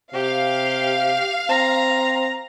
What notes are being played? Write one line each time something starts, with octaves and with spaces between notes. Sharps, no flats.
C3 G4 F5
C4 A#5